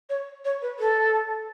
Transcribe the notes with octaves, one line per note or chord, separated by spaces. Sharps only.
C#5
C#5
B4
A4